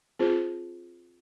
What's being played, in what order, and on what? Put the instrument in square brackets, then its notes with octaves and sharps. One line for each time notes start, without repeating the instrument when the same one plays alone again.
[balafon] C4 F4 G#4 C5